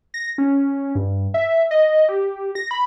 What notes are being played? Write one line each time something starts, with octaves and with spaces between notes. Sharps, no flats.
A#6
C#4
G2
E5
D#5
G4
A#6
B5